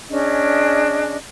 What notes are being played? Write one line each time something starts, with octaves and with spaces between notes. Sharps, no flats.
C#4 D4 G#4 D#5